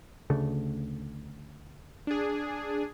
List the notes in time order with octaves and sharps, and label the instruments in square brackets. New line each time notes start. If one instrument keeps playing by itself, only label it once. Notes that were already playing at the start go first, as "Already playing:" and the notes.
[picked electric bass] D2 C#3 A3
[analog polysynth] D4 G#4